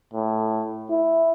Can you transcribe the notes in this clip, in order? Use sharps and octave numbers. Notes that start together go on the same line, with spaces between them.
A2
E4